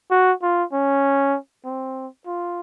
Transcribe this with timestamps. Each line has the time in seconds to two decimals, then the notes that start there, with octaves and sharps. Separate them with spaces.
0.11 F#4
0.42 F4
0.73 C#4
1.65 C4
2.26 F4